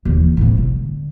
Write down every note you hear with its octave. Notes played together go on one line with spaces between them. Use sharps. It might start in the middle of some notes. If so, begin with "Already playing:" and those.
D#2 E3
A2 C3
D3